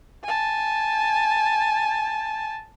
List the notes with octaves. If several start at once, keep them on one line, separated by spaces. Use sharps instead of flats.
G#5 A5